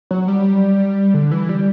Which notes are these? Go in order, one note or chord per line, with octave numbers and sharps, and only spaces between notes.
F#3
G3
D3
E3
G3